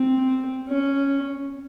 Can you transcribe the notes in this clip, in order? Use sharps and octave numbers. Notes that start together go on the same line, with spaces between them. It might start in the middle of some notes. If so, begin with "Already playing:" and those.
Already playing: C4
C#4